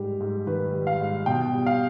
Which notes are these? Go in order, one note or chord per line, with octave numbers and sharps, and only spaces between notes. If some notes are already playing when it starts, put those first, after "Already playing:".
Already playing: G#2 G3 G4
G#2
D#3 B4
G3
F5
G#2
B2 G5
G3
F5